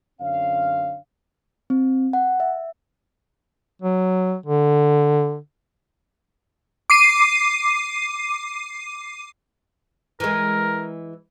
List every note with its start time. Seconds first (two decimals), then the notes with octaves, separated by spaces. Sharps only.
0.20 F#2 D3 C4 C#5 F5
1.70 C4
2.13 F#5
2.40 E5
3.82 F#3
4.46 D3
6.90 D6 C7 D#7
10.20 E3 G#3 A#4